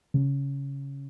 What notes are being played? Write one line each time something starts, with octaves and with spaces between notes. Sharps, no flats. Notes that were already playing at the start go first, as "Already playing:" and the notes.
C#3